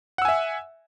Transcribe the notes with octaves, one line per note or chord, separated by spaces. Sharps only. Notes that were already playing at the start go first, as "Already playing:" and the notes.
E5 F#5 G#5 E6